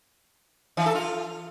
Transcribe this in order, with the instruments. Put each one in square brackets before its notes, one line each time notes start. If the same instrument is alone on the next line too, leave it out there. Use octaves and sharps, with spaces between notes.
[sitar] E3
A4
F4